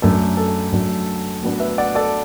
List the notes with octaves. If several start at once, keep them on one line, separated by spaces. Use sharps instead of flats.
F#2 F#3 A3 D4 A4
A4
F#2 F#3 A3 D4
A2 F#3 B3 D4
B4 E5
D5 F#5
A4 D5